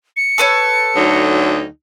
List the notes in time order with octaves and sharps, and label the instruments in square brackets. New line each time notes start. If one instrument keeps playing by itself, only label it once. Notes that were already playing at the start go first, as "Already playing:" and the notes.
[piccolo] C#7
[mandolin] A4 B4 C#5
[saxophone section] D2 F#3 D#4